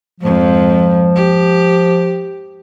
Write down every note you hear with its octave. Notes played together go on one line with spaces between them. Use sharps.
F2 G#2 F3
G4